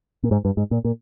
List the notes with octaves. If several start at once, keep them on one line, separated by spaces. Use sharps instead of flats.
A#2
G#2
G2
G#2
A#2
A#2